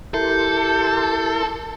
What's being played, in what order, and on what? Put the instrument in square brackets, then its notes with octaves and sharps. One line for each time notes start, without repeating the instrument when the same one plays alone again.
[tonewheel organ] E4 A#4 C6 [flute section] G4 G6 [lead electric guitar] A4